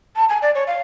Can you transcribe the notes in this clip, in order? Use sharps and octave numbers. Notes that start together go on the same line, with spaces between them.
A5
G#5
D5
C#5
F5